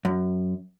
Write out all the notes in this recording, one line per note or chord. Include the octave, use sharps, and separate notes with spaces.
F#2